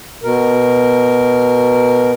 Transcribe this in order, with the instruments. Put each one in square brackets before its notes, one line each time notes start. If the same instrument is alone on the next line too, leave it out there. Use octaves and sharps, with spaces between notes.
[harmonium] B2 A#4